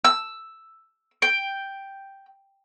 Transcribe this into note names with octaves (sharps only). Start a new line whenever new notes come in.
E6
G5